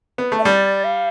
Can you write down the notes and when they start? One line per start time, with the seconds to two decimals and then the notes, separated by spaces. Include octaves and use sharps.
0.18 B3
0.32 A3
0.39 E5
0.44 G3 D5
0.84 F5